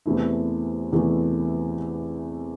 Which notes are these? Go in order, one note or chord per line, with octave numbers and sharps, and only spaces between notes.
E2 C3 E3 A3 E4
E2 C3 E3 A3 E4